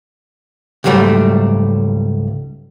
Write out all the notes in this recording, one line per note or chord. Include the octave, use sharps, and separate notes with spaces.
C#2 G#2 F#3 G3 A3